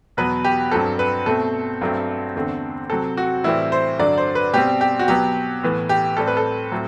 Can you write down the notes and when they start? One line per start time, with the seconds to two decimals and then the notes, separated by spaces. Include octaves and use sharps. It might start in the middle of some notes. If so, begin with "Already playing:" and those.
0.17 E2 B2 F#3 B3 B4
0.44 G4
0.71 G2 F#3 C4 A4
0.99 B4
1.26 B2 A3 C4 A4
1.81 G2 F#3 A3 C4
2.35 E2 D3 A3 C4
2.90 C3 F#3 C4 A4
3.17 F#4
3.44 A2 E3 G3 C4 E4
3.72 C5
3.99 G2 D3 F#3 D5
4.18 C5
4.35 B4
4.53 B2 G3 C4 G4
4.81 G4
4.99 F#4
5.08 B2 F#3 B3 G4
5.63 A2 E3 B3
5.89 G4
6.17 A2 G3 C4 A4
6.27 B4
6.37 A4
6.72 A2 F#3 A3 C4